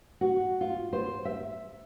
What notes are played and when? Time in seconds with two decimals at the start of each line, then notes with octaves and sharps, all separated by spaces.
0.21 F#4
0.61 F4
0.93 C5
1.25 E5